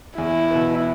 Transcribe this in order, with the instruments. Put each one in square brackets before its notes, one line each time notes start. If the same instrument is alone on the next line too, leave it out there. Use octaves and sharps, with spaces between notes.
[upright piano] E2 [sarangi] E4
[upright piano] B2 B3